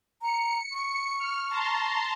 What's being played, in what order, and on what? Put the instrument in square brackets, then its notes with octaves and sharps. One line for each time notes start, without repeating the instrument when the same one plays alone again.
[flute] A#5 [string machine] C#7
[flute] C#6
[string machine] F6
A5 A#5 C6